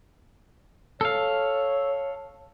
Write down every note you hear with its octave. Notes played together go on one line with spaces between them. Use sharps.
A4 C#5 F5